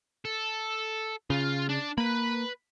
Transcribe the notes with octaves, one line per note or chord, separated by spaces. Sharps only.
A4
C#3 F4
D4
A#3 B4 B5